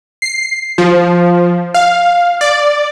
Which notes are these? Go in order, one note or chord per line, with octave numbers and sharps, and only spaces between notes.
C7
F3
F5
D5